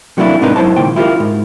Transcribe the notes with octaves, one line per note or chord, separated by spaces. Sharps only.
C3 F#3 A3 A#3 D4 E4
G#2 C3 D4 D#4 A#4 B4
F#2 E4 C5 C#5 A5
C#2 A#2 D#3 G5
E4 F4 G4 A#4
G#2